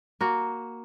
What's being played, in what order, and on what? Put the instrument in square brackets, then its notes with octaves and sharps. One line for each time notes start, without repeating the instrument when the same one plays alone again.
[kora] A#3 F#4